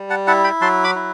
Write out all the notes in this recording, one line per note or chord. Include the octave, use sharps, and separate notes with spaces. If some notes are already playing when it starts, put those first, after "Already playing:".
Already playing: G3
F#5 A5
E4 F#5 A5
G5 B5
F#3 A5 C6
B5 D6
E4